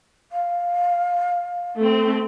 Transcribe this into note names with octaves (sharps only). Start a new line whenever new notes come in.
F5
A3 C4